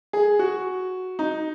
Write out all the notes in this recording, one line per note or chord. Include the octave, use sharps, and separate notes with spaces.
G#4
F#4
D#4